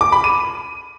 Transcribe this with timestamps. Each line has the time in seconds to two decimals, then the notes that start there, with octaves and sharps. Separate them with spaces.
0.01 D6
0.12 B5
0.24 D#7